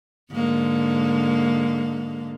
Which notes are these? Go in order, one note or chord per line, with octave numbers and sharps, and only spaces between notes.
G#2 D3 A#3